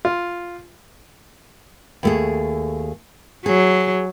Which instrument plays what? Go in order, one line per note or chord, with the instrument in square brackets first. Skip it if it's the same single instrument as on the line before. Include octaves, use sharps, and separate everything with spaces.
[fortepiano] F4
[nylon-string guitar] D#2 A3 G#4
[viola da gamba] F#3 [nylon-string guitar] G#4